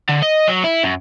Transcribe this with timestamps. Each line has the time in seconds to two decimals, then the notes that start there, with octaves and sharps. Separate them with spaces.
0.09 D3
0.23 D#5
0.48 F#3
0.64 E4
0.83 F#2